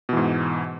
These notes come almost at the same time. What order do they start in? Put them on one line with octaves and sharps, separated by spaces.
B2 E3 G#2